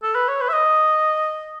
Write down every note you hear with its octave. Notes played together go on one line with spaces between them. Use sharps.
A4
B4
C#5
B4
E5
D#5